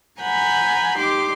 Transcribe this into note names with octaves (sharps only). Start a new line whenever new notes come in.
F#5 G#5 A#5 B5 G6
D#4 G4 C6 D6